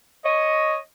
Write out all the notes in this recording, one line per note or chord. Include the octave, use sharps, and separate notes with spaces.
C#5 D#5